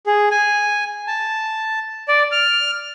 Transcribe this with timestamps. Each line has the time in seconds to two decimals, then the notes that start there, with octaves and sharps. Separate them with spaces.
0.06 G#4
0.31 G#5
1.07 A5
2.08 D5
2.32 F6